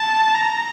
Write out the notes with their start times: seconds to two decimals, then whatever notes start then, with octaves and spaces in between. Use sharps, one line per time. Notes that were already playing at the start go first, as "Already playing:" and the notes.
Already playing: A5
0.35 A#5